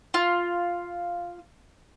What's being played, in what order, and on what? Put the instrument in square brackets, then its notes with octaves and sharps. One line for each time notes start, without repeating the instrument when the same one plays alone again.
[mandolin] F4